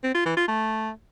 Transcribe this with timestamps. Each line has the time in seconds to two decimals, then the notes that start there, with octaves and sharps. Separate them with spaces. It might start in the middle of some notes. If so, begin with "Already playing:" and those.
0.03 C4
0.14 F4
0.26 E3
0.37 F4
0.48 A3